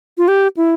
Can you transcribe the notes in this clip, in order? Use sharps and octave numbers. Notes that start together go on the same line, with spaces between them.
F4
G4
E4